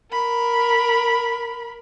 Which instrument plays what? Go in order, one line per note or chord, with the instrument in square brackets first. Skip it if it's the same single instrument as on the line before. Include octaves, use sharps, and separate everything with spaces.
[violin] A#4 B5